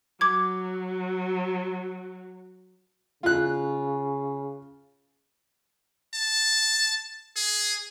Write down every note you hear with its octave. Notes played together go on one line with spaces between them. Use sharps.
F#3 D6 G#6
C#3 F4 F#6
A5
G#4